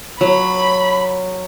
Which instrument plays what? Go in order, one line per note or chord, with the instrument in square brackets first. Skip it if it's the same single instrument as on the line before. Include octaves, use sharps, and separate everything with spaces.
[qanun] F#3 [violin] B5